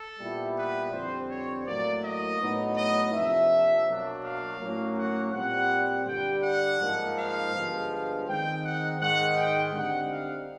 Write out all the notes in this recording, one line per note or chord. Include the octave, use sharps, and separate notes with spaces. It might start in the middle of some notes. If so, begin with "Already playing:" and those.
Already playing: A4
A#2 G3 B3 E4
B4
F2 D3 G3 C4 C5
C#5
A2 F#3 A#3 D5
D#5
A2 F#3 B3 D#4
D#5
F2 C3 F3 A#3 D4 E5
B2 F#3 A#3 D4
F5
A2 F#3 A#3 C#4
F#5
A#2 G3 C4 F#5
G2 D3 G3 G5
F#5
G#2 F3 A#3 D#4
F5
G2 D3 F3 G#3 B3
F5
D#3 G#3 C4 D#4 G5
F#5
G#2 D#3 G#3 F#5
G5
D3 G3 C4 D#4 F#5
F5